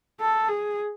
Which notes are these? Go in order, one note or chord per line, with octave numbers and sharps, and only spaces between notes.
A4
G#4